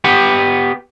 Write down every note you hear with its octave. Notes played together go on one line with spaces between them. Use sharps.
B3 G4 F#5